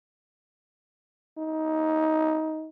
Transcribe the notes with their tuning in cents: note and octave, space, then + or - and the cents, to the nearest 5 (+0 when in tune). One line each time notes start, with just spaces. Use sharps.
D#4 +15